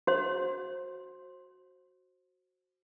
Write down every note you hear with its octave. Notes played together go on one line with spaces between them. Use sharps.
F#4 C5